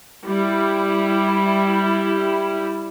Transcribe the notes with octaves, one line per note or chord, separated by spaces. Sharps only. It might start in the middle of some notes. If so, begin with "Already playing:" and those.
G3 E4